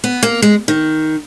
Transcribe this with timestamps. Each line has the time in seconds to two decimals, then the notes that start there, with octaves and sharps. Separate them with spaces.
0.04 B3
0.23 A#3
0.42 G#3
0.68 D#3